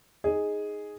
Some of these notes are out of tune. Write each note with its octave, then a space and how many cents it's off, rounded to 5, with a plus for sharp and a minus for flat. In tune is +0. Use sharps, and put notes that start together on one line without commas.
D#4 +0 G#4 +0 D#5 +0